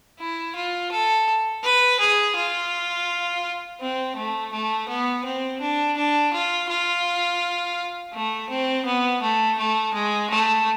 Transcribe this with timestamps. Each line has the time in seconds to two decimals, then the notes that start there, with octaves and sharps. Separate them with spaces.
0.19 E4
0.56 F4
0.92 A4
1.64 B4
2.00 G#4
2.36 F4
3.80 C4
4.16 A3
4.53 A3
4.89 B3
5.25 C4
5.60 D4
5.97 D4
6.33 F4
6.69 F4
8.13 A3
8.50 C4
8.86 B3
9.22 A3
9.58 A3
9.94 G#3
10.30 A3